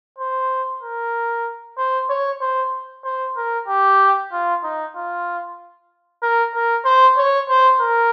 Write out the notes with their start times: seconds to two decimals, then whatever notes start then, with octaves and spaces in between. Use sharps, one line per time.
0.18 C5
0.83 A#4
1.78 C5
2.10 C#5
2.41 C5
3.04 C5
3.37 A#4
3.68 G4
4.32 F4
4.64 D#4
4.95 F4
6.23 A#4
6.54 A#4
6.85 C5
7.18 C#5
7.50 C5
7.80 A#4